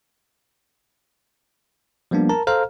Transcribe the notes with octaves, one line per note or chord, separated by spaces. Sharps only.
F3 G3 A#3 B3 D4
A#4 A5 A#5
A4 C5 F5 A#5 F6